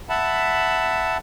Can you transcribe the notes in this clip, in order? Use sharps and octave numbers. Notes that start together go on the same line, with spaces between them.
E5 F#5 A5 B5